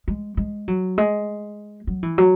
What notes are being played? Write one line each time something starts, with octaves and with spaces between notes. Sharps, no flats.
G#3
G#3
F#3
G#3
F#3
E3
F#3